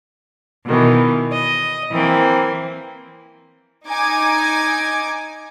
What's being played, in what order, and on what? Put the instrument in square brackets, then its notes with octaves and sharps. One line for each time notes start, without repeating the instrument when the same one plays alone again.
[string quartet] B2 D#3 E3
D#5
E3 A#3 C4
[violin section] D#4 G#5 D6 G#6